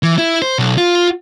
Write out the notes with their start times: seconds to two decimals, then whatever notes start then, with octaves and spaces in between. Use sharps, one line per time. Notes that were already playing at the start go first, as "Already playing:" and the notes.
0.03 E3
0.18 E4
0.42 C5
0.59 B1
0.78 F4